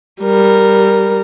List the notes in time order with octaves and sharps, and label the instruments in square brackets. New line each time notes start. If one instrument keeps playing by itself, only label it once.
[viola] G3 A#4